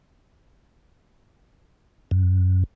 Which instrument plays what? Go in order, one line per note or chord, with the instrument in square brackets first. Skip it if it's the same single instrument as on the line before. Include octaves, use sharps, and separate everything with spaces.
[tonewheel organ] F#2